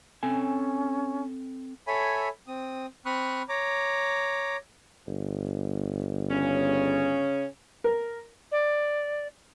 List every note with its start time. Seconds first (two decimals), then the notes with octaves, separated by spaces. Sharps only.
0.23 C4 C#4 A4 G#5
1.87 A4 C#5 E5 G#5 B5
2.47 C4 D#6
3.06 C4 B5 C#6 D#6 F6 F#6
3.49 C#5 A#5 D6
5.07 G1
6.30 C#3 C#4
7.84 A#4
8.51 D5